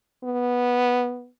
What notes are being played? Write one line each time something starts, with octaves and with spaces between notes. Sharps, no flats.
B3